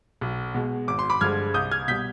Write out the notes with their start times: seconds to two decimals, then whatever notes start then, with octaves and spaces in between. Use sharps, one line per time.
0.21 B1
0.54 B2 G#3
0.88 G#1 D6
0.99 C6
1.10 B5 D6
1.21 G2 D3 F3 G#3 F6 G#6
1.54 C2 D#6 G6
1.71 F6 G#6
1.88 B2 G3 G6 B6